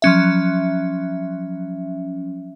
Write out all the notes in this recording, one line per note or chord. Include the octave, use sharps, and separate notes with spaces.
F3 F#3 C#4 E5